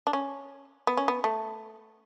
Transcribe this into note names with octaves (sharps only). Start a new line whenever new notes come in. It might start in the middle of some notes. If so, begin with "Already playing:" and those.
D4
C#4
B3
C#4
B3
A3